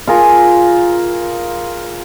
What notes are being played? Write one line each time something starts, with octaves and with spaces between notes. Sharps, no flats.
F4 G#4 A#4